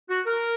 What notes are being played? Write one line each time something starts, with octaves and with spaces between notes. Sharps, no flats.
F#4
A#4